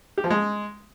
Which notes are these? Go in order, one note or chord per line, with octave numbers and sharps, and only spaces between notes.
G4
F3
G#3